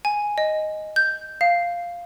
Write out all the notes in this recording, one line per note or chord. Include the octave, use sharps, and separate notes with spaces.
G#5
D#5
G6
F5